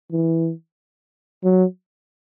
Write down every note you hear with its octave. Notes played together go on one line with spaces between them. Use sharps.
E3
F#3